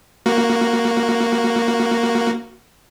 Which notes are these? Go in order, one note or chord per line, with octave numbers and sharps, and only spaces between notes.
A#3 F#4